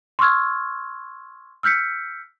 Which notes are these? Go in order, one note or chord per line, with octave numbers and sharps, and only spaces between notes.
C6 C#6 E6 F6 G#6
E6 F6 G6 B6 C#7